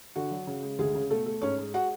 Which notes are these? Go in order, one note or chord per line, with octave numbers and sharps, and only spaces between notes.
D3 F#4
F#3
C#3
G#3
D2 G#3 G#4
C#3
B2 A3 A4
A3
G#2 C#4 C#5
G#3
F#4 F#5